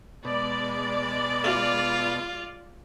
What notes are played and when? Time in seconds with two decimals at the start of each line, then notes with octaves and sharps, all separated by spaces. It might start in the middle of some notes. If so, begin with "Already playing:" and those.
0.25 B2 G#3 D5
1.44 F4